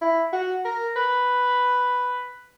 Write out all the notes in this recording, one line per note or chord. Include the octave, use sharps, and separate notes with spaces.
E4
F#4
A#4
B4